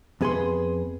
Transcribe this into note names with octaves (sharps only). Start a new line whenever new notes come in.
F2 B3 G#4 B4 F#5 C6